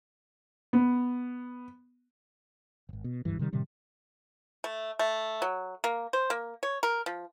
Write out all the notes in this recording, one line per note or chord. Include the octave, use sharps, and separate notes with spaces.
B3
D#1 G#1
B2
G#1 D2 G2 E3
C3 D#3 G3
A2 C3 D#3 G3
A3
A3
F#3
A#3
C5
A#3
C#5
A#4
F3